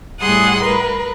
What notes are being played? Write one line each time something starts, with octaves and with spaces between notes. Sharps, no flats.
A2 G3 G#4 F#5 C6 D#6
A#4 B4